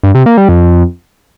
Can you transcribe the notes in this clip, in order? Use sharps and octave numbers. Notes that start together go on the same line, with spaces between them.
G2
C3
A#3
G3
F2